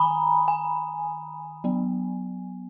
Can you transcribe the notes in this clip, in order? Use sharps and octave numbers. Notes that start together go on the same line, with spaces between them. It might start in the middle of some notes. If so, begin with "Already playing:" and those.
Already playing: D#3 G#5 A#5 B5 D#6
G#5
F#3 B3